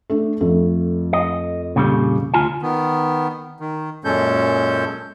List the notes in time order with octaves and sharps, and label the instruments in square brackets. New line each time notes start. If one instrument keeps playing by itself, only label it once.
[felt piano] A3 D4
F2 A3
[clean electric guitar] D#5
A#2 C#3 G3
D2 F4 G#5
[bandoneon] D#3 B3
D#3
F#2 A#2 G#3 C#4 A4 G6